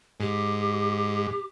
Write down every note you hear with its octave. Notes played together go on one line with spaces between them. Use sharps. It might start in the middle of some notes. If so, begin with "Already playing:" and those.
G#2 G4